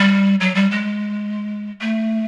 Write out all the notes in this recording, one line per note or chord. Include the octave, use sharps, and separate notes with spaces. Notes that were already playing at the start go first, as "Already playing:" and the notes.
Already playing: G3
F#3
G3
G#3
A3